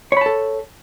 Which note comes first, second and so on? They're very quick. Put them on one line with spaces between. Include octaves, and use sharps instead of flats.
C#5 B5 A5 A4